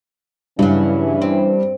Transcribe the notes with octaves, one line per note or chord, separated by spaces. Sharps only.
G2 C#3 E3 F#3 C#4 E4
C4